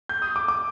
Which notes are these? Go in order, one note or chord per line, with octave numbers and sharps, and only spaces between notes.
G6
D#6
D6
D6